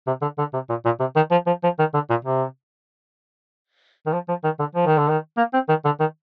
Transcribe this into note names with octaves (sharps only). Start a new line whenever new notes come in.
C3
D3
D3
C3
A#2
A#2
C3
D#3
F3
F3
F3
D#3
D3
A#2
C3
D#3
F3
F3
D#3
D3
F3
D#3
D3
D#3
A#3
C4
D#3
D3
D#3